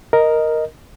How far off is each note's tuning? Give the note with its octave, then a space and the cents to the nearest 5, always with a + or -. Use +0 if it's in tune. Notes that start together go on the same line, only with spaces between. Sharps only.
A#4 +0 D#5 +0